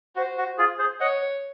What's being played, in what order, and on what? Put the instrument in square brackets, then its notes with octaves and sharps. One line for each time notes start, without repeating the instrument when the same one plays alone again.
[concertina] F#4 [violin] C5
[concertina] F#4
F4 G#4
G#4 C5
[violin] C#5 [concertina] D#5 F#5